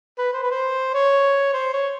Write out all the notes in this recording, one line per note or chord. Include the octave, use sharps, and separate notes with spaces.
B4
C5
B4
C5
C#5
C5
C#5